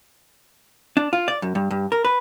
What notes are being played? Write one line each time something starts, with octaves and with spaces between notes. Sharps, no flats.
D4
F4
D5
F#2
G2
G2
A#4
B4